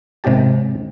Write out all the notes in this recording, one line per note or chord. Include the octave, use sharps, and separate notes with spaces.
G#1 C3 D#3 C#4 G4 A5